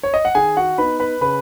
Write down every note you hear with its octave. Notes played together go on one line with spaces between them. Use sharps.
C#5
D#5
F#5
D#3 G#4 G#5
F#4 F#5
B3 D#4 B4 B5
B4 B5
C#3 B4 B5